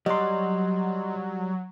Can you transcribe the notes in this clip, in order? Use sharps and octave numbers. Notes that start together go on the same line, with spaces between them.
F#3 G3 D5 D#5 C6